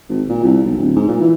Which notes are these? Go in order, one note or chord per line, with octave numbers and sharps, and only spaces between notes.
G#1
A#2
C2
B1
D1
G#2
A#2
E3